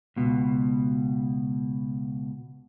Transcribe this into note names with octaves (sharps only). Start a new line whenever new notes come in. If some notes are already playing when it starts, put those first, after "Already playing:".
C#2 B2